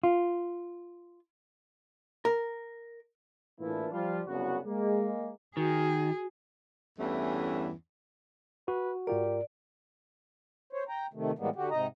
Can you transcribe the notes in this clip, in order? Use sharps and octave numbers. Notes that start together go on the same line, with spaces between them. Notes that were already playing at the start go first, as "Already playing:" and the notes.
F4
A#4
A2 E3 A#3 D4 E4 F4
F3 G3 F4
F#1 C2 C#3 B3 F#4
G#3 A#3
D#3 F#4 G#4
E2 G2 E3 A3 C#4
F#4 B4
G#2 F4 G4 A#4 D5
C5 C#5
G5 A#5
C3 D#3 A3
A2 E3 G3 G#3 A#3 B3
D3 F#4 G4
G#2 C3 D#4 D#5 A#5